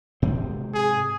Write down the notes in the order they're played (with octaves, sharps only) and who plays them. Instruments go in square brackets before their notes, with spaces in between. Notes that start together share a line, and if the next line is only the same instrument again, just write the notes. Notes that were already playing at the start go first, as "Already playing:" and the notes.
[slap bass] G#2 C3 C4
[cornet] G#4